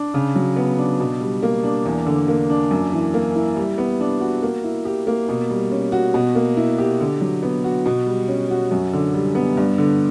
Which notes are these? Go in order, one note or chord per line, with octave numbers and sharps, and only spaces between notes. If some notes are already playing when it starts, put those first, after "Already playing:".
Already playing: D4
C#3
F#3
B3
D4
B2
G3
A#3
D4
E2
D3
A#3
D4
F#2
E3
A#3
E4
G3
B3
D4
F#4
A#3
E4
G4
A#3
B2
G3
C#4
F#4
B2
A#3
E4
G4
D3
F#3
B3
F#4
B2
G3
C#4
F#4
F#2
D3
G3
B3
G2
D3